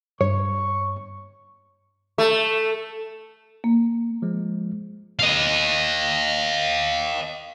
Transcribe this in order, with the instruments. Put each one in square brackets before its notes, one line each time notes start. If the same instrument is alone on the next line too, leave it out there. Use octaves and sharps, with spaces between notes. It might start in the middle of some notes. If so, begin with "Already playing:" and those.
[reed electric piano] G2 [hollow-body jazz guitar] C#5 [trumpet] C#6
[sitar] A3
[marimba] A#3
[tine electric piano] F3 G#3
[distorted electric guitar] D#5 F5